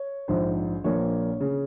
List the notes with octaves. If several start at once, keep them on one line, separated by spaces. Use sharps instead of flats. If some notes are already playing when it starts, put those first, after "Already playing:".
Already playing: C#5
A#1 G#2 F3 C5
A#1 A#2 F3 A#3 C#5
C#3